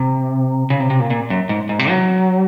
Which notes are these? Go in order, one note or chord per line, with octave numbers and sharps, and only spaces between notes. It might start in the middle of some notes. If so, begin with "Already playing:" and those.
Already playing: C3
C#3
C3
C3
A#2
A#2
F#2
G#2
G#2
C3
F#3